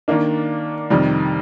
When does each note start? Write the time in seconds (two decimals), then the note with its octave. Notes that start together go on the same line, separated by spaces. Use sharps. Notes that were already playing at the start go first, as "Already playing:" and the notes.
0.08 D#3 A#3 D4
0.90 F2 C3 D#3 G3